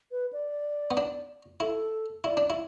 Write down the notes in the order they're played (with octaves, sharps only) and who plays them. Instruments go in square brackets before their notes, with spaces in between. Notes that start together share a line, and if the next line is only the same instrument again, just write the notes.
[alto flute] B4
D5
[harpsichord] B3
D4
[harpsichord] E4 [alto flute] A4
[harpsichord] E4 [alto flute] D5
[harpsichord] D4
E4